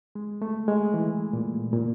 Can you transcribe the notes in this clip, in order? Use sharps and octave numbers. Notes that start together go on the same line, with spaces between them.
G#3
A3
G#3
E3
A#2
A#2